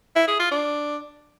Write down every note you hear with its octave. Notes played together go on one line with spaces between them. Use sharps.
E4
G#4
F4
D4